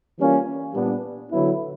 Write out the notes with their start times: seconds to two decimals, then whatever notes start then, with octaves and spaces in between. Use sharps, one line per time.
0.18 E3 G3 A#3 C#4 F4
0.74 A#2 G3 B3 D4
1.31 D3 F#3 B3 E4